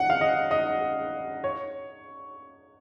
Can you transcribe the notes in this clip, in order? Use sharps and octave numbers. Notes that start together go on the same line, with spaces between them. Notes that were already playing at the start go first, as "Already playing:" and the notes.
Already playing: F#5
F5
D#5
D#5
C#5